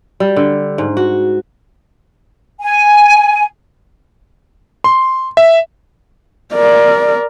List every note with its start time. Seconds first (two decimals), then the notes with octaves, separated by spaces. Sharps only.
0.20 G3
0.36 D3
0.78 G#2
0.97 F#4
2.60 G#5
4.84 C6
5.37 E5
6.54 A#4 D5